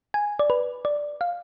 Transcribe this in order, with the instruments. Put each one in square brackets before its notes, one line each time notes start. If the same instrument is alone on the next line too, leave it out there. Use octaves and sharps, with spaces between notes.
[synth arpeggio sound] G#5
D5
B4
D5
F5